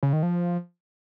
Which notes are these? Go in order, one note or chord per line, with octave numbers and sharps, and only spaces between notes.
C#3
D#3
F3